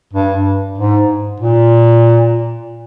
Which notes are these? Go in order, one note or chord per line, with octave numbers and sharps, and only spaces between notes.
G2
G#2
A#2